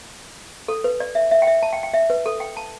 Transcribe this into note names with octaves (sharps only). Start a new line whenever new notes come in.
A4
B4
D5
E5
E5
G5
E5
A5
G5
G5
E5
B4
A4
G5
A5